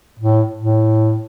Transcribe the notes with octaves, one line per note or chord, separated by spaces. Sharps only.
A2
A2